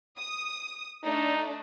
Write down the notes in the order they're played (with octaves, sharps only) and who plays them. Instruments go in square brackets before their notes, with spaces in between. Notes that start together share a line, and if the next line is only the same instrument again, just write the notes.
[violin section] D#6
[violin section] A3 D4 [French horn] D#4